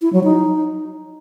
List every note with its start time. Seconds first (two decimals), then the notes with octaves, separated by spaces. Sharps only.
0.02 E4
0.13 F#3
0.24 D#4